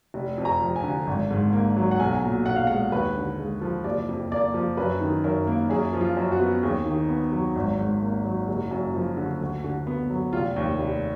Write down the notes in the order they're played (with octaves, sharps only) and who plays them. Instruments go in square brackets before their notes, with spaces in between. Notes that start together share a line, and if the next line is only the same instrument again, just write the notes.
[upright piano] F1
F2
A#5
F3
G#5
D3
G#1
G#2
A#3
F#3
F#5
B1 G#5
A#2
B1 F#5
F5
G#3 F#5
D#2 B4
D3
G#3
F3
F#1 D5
F2
A#3 D5
F3
F#2 B4
D#3
F#2 A#4
A#3
F#2 G#4
F3
F4
F#2
F#4
B3
D#2 G#4
D#3
B3
F#3
G#1
G#2
A#3
F#3
F#1
F#2
F3
D3
D2
D3
B3
F#3
F1 F4
D#2
F1